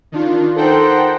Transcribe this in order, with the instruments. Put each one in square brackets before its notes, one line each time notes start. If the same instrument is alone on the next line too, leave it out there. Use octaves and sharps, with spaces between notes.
[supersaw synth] D#3 D4 F4
[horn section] D#4 A#4 C5 [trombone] A4 [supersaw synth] F#5 G5 A5